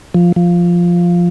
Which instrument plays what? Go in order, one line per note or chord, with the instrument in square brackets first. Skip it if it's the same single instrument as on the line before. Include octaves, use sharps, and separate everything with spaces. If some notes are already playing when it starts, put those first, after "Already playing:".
[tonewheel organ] F3
F3